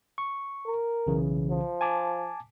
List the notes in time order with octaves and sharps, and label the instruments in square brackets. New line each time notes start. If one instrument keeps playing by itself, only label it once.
[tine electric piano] C#6
[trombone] A#4
[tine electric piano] B1 C#3 E3
[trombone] F3
[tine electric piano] G#5 A5 D6